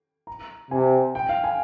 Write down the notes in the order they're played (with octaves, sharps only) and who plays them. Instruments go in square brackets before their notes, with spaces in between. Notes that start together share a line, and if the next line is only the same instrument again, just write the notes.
[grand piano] A#5
[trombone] C3 [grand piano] G#5
[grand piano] G5
F5
G#5